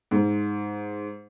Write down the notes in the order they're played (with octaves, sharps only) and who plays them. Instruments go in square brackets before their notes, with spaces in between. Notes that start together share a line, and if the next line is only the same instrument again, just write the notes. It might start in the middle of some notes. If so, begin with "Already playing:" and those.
[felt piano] G#2